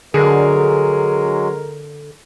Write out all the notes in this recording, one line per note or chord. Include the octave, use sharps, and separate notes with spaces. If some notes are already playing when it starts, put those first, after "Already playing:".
D3 F#3 G#3 G#4 A#4